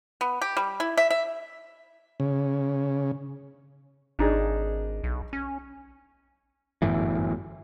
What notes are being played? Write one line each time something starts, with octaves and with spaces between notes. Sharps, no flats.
B3
G4
G3
E4
E5
E5
C#3
G#1 D4 D#4 G#4
B1
C#4
G1 F#2 A2 E3